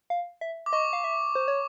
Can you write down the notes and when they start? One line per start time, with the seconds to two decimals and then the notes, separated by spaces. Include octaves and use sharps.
0.10 F5
0.41 E5
0.66 D6
0.73 D#5 C#6
0.93 F5
1.04 E5
1.35 C5
1.48 C#5